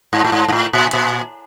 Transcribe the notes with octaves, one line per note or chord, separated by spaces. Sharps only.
G#2
A2
G#2
G#2
A2
A#2
A#2